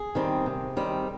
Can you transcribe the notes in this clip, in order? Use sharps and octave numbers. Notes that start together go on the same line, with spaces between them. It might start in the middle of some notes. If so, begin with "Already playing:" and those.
Already playing: G#4
D#3 G3 C4
C3
D#3 G3 C4